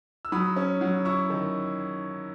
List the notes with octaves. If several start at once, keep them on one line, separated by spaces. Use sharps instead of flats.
E6
F#3 B5 D#6
C#4
F#3
E4 C#6 E6
D#3